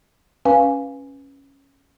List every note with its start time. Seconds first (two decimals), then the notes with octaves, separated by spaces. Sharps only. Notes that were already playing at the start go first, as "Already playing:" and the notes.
0.45 C#4 B4 F5 G#5